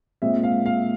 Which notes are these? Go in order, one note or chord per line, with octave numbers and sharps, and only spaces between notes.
A#2 G#3 C4 E5
F5
F5